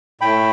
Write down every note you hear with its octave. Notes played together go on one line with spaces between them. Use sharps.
A2 A3 G5 B5